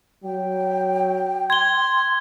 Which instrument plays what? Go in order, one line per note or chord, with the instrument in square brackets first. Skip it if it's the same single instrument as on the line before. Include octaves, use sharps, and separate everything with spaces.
[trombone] F#3 [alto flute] G5
[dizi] C6 [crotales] G#6 G7